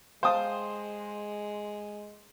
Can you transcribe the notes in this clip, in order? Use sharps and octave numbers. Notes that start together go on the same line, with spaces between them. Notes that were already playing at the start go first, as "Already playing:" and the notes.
G#3 C5 F5 G5 A5 D#6